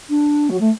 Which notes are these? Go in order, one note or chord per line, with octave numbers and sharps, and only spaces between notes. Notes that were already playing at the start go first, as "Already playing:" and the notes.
D4
F#3
A3